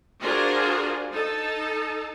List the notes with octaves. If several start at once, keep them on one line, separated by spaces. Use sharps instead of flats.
D4 F4 F#4 G#4 A#4 C5
D#4 A4 A5